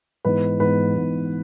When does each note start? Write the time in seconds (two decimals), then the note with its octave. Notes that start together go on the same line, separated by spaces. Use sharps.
0.25 G#2 E3 B3 B4
0.60 G#2 E3 B3 B4
0.95 G#2 E3 B3